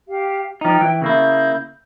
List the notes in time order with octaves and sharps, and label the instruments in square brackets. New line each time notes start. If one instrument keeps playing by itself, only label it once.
[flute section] G4 F5
[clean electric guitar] F3 D#4 [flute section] G5
[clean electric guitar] E3
[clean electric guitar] C#3 A#3 E4 [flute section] G6